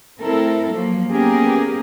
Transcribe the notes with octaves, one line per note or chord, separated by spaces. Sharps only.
A3 C4 E4 A4 A#4
F3 F#3 A#3
A#3 B3 C#4 G4 G#4 A#4